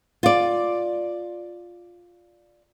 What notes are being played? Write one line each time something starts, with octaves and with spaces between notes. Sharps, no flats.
F4 D5